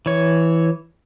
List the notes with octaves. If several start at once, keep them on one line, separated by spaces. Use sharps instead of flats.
E3 C#5